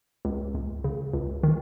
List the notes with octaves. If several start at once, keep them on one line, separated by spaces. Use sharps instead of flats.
C#2
C#2
C#3
C#2
D#3